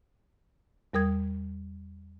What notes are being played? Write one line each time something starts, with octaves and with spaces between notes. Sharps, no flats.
E2 G3 A#4 D#6 G#6